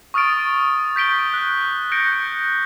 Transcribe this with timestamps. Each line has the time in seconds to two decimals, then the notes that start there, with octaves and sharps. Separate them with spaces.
0.14 C#6 D#6 F6 A6 D7
0.96 G6 B6 D7 G7
1.34 F#6
1.92 F#6 G6 A#6 C#7 D7